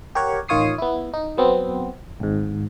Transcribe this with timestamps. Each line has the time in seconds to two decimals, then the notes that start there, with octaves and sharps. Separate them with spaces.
0.15 G4 A#4 C#5 F#5
0.48 A1 D#3 F4 C#5 D#6 C7
0.78 B3 E4
1.14 D#4
1.37 F#3 B3 C4
2.20 G#1 G#2